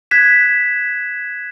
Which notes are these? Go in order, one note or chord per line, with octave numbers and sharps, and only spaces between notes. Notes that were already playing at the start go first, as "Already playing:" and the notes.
F#6 G#6 B6 E7